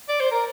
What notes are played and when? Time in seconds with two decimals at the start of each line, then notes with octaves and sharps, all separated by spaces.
0.09 D5
0.20 C5
0.32 A#4